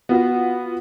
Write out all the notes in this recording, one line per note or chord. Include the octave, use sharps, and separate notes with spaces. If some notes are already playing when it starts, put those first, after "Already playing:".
B3 F4 F#4